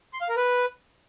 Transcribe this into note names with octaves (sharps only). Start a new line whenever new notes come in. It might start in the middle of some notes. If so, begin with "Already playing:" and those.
C6
F5
A#4
B4